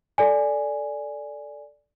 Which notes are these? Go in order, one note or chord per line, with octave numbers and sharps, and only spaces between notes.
A4 D5 G#5